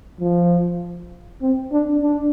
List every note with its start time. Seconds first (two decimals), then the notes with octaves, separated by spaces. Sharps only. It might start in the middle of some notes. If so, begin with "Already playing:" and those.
0.20 F3
1.42 C4
1.72 D4
2.02 D4